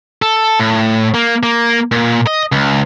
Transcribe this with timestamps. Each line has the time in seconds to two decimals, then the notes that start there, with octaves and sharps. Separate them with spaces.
0.22 A4
0.60 A2
1.14 A#3
1.43 A#3
1.92 A#2
2.27 D#5
2.52 C#2